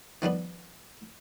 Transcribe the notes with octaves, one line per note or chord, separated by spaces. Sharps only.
D#3 F3 G3 B3